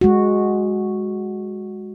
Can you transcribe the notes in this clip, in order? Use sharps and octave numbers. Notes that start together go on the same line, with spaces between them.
G#3 F#4